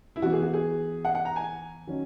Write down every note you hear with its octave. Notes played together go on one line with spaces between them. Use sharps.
E4
E3 B3 F#4
G#4
F#4
G#4
F#5
F#5
A#5
G#5
D#3 F#3 C#4